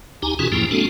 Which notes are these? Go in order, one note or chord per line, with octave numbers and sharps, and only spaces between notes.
D2 D#4 G4 G#5 A#5
B2 E3 C#4 F4 F#4 G#4
F2 A2 F3 A#3 E4 G5
G#3 A#3 C4 D4 F#4 A4